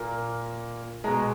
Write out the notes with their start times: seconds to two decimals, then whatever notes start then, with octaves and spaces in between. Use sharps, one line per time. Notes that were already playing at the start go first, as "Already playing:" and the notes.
Already playing: A#2 A#3
1.04 B2 G#3 A#5